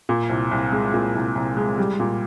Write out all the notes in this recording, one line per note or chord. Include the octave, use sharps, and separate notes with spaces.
A#2
C2
C2
G#3
A#2
C2
C2
G#3
G3
A#2